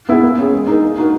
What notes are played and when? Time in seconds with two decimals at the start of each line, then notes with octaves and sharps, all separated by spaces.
0.09 B3 E4 G#4
0.23 A#3
0.38 C#4 G#4
0.52 G#3
0.67 D#4 A#4
0.82 A#3
0.98 D#4 F#4 A#4